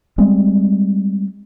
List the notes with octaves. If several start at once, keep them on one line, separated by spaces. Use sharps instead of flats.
G3 G#3 C4